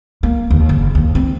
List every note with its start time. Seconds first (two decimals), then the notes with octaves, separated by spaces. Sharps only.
0.23 A#3
0.51 D#2
0.69 F#1
0.95 D#2
1.15 C4